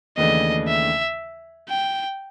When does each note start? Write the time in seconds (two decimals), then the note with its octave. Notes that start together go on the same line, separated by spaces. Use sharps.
0.17 D#2 C#3 E3 A3 D4 D#5
0.68 E5
1.69 G5